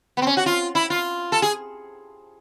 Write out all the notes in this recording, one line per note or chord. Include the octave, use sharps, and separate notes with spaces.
B3
C4
C#4
F#4
F4
E4
F4
A4
G#4